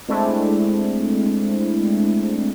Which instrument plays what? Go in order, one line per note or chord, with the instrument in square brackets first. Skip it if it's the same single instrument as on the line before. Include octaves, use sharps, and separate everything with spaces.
[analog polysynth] G#3 A3 C4 D4 E4